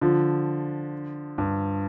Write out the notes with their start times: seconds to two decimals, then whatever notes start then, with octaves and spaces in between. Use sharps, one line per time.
0.01 D3 F3
1.38 G2